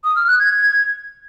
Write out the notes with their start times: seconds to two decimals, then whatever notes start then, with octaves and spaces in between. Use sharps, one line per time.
0.04 D#6
0.16 F6
0.28 F#6
0.40 G#6